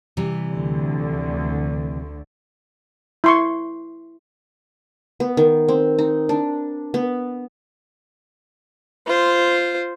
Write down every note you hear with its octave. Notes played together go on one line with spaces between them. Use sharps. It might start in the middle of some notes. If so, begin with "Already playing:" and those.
C3 E3 G3
D2 D3
E4 C6 C#6
B3
D#3
C4
D#4
D4
B3
F4 C5